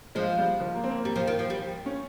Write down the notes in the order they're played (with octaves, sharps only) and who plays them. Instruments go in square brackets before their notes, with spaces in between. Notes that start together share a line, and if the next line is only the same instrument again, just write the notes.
[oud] F3 [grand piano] G#3
[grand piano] G3
F3
A#3
C4
A#3
[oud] G3
F3
D#3
F3
G3
[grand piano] C#4